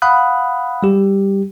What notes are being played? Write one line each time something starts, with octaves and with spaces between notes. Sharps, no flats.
F5 F#5 B5 D#6 F#6
G3 G4